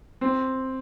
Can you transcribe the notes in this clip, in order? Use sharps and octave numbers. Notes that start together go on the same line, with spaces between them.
C4